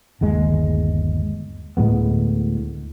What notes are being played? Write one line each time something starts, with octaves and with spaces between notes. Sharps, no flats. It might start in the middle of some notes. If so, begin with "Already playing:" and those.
G1 D#2 G#3
D2 A2 G#3 B3